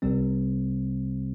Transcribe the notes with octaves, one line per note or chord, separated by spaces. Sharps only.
C2 C3 G3 C4